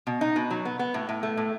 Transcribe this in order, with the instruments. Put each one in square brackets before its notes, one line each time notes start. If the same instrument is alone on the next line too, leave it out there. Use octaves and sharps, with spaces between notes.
[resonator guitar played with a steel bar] B2
D#4
B2
F#3
B3
B3
A2
A2
A3
A2